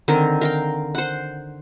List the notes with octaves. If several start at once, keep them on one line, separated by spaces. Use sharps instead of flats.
D3 D#3 C4 A#4
A#4 F5 G5
C5 F#5